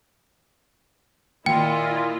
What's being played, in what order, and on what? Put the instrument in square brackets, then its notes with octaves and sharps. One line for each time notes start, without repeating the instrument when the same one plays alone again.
[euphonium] A#2 [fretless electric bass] D#3 A#3 [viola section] E4 F4 D#5 [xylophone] G5